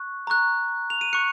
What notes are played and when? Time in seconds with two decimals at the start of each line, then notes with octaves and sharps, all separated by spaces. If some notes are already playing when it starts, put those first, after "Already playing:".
Already playing: C#6 F#6
0.27 A#5 C#6 F#6
0.90 F7
1.01 D#7
1.13 C#6 F#6 C#7